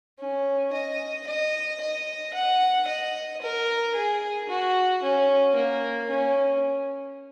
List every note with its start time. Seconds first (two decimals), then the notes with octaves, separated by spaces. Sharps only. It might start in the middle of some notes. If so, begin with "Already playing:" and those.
0.20 C#4
0.73 D#5
1.27 D#5
1.81 D#5
2.34 F#5
2.87 D#5
3.41 A#4
3.95 G#4
4.49 F#4
5.03 C#4
5.56 A#3
6.10 C#4